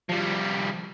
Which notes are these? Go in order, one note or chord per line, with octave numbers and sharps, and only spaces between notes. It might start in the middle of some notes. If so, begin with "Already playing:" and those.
F3 G3